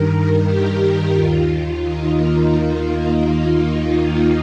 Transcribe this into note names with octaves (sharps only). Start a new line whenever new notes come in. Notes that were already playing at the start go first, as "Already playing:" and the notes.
Already playing: G2 D#3 A#4
G4
D#2 D#3 F4
D#4
A#3